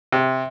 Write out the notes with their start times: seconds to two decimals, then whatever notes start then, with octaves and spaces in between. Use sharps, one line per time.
0.12 C3